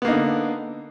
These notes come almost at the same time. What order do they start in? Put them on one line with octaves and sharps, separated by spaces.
B3 A#3 D#4 D3